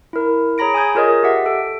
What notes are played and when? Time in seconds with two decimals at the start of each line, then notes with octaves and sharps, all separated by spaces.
0.13 E4 A#4
0.58 G#4 C#5 A#5 B5 A#6 D7
0.74 G#5 D#6 G6 G#6
0.95 F4 G#4 A#4 C#5 D#5
1.23 G4 E5 F#5
1.46 A4 D7